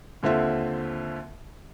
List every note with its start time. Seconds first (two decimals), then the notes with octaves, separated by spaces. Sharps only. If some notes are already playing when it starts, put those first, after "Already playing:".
0.23 D#2 D3 C4 F4 E5